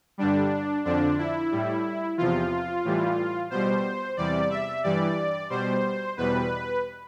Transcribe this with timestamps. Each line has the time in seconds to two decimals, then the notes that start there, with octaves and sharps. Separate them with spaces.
0.18 G2 D3 G3 D4
0.85 F2 D3 F3 D4
1.18 E4
1.51 A2 G3
2.18 E2 C3 F3 F4
2.85 A2 E3 G3
3.50 B2 G3 C5
4.17 E2 C3 G3 D5
4.50 E5
4.84 G2 E3 G3 D5
5.50 B2 G3 C5
6.17 E2 B2 G3 B4